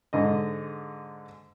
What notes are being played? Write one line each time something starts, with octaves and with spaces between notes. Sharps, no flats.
G#2 D3 D#5